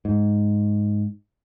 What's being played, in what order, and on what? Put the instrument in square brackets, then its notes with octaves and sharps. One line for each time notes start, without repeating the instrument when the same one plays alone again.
[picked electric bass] G#2